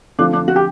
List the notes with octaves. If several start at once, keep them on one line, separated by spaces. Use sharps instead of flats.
D3 F3 A3 C4 D4 F4
D4
F#4
G4